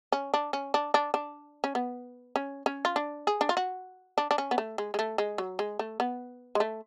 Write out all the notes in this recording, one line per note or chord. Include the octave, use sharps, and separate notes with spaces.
C#4
D4
C#4
D4
D4
D4
C#4
B3
C#4
C#4
F4
D4
G#4
D4
F4
F#4
D4
D4
C#4
B3
A3
G#3
G#3
A3
G#3
F#3
G#3
A3
B3
G#3
A3